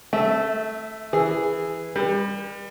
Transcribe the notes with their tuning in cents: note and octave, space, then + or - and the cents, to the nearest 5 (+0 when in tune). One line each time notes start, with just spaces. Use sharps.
A3 +0 E5 -25
E3 +0 G#4 -10
G3 +30 B4 -45